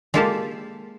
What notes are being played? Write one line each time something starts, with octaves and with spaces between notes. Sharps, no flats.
G#3 A#3 F4 G4 A4 A5